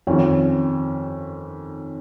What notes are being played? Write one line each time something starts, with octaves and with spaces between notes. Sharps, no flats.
F2 D#3 C#4